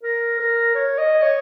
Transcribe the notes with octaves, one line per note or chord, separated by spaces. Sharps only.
A#4
A#4
C#5
D#5
C#5